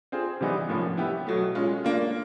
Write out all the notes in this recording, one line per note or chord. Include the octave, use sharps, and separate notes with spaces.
C4 F4 G#4 C5
C3 E3 G3 B3 D#4
A2 F3 A#3 C#4
B3 E4 G4
B2 F#3 A3
G#3 C#4 F4
A#3 D4 F4